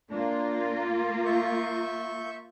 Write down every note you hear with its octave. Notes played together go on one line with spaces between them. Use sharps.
A#3 D4 F4
E5 C#6 G6